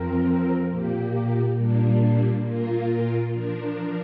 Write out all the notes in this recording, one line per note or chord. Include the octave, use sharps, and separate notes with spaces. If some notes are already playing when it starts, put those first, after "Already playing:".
Already playing: F2 F3 C4 A#4
A#2 A#3 G4
A#2 G3 A#3 D4
A#2 A#3 F4 A#4
F3 D4 A#4